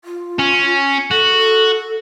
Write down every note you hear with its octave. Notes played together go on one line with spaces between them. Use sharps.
F4
C#4
F#4 A4
A4